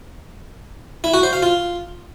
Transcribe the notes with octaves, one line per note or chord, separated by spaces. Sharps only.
E4
F#4
C5
F5
F4